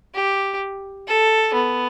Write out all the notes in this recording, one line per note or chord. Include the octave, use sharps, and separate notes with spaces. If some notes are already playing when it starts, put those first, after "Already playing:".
G4
A4
B3